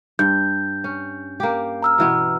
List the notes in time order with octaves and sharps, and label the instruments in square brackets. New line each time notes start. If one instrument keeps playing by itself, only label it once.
[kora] G2 [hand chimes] G6
[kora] C#4
A#3 G4
[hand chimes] A#5 E6 F6
[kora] B2 E3 B3